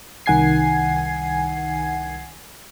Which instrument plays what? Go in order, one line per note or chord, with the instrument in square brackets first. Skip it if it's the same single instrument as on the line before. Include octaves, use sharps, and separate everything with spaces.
[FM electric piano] C2 D#3 F#5 G#5 G#6 C7